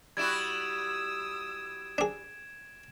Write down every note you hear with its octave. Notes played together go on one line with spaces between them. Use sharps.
G3 E4 F#4 D#6 E6 G#6 D7 E7
D4 G#4